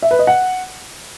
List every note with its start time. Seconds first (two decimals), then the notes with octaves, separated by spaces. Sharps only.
0.02 E5
0.11 B4
0.19 D#5
0.27 F#5